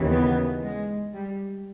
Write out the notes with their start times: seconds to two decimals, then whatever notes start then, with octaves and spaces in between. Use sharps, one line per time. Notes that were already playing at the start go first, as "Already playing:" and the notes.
Already playing: D#2 C#3 E3
0.12 B3
0.63 G#3
1.14 G3